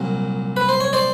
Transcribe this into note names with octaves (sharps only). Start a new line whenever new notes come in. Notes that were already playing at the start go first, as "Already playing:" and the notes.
Already playing: C2 A#2 F#3
B4
C5
C#5
C5 D5